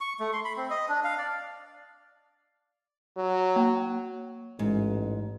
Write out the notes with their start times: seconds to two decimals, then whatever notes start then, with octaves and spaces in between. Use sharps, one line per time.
0.01 C#6
0.20 A3
0.33 C6
0.45 B5
0.57 C4
0.70 D#5
0.89 D4
1.04 F5
1.18 D5
3.17 F#3
3.56 A#3
4.59 A1 G#2